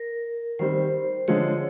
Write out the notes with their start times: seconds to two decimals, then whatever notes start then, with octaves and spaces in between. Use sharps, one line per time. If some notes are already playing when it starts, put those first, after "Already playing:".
Already playing: A#4
0.59 D#3 G3 C4 C5
1.28 D3 F3 G#3 C#5